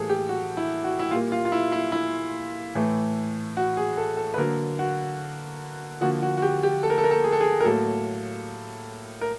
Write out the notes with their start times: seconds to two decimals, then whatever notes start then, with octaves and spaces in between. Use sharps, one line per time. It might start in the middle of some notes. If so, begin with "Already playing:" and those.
Already playing: A2 E3 G3 A#3 G#4 A4
0.09 G4
0.29 F#4
0.57 E4
0.84 F#4
0.99 E4
1.11 A#2 G3 A#3 F4
1.32 F4
1.45 F4
1.52 E4
1.72 E4
1.92 E4
2.75 A2 E3 A3
3.57 F#4
3.77 G#4
3.97 A4
4.17 A4
4.34 B4
4.38 D3 F#3 A#3 A#4
4.79 F#4
6.01 D3 F3 A#3 F#4
6.22 F#4
6.37 F#4
6.42 G4
6.63 G4
6.83 A4
6.90 A#4
6.98 A4
7.04 A#4
7.11 A4
7.24 G#4
7.32 A4
7.41 G#4
7.61 A#4
7.64 A2 F#3 A#3 A4
9.21 A#4